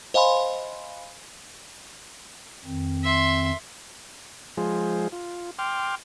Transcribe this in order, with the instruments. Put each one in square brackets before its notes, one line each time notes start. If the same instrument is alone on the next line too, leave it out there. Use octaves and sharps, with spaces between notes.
[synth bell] C5 D#5 F5 G#5 B5 C6
[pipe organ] F2 D#3 C4
[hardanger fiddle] E5 C6
[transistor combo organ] F3 G#3 F4 G#4 C5
F4
G5 C6 D6 F6